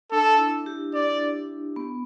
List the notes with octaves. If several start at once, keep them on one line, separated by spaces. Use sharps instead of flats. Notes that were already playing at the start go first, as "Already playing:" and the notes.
D4 A4
E4
G4
D4 D5
B3